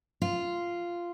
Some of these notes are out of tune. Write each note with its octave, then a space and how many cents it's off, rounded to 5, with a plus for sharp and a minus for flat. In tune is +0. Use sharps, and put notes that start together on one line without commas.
F4 -10